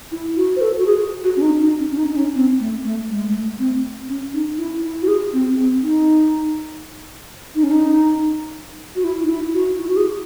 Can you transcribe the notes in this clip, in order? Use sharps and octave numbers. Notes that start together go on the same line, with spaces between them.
E4
F#4
C5
A4
F#4
G#4
F#4
C#4
D#4
D#4
C#4
C#4
D#4
D#4
C#4
C4
A3
A3
G#3
G#3
A3
C4
C#4
D#4
E4
E4
F#4
G#4
C4
C4
D#4
D#4
C#4
D#4
F#4
E4
D#4
E4
F#4
E4
F#4
G#4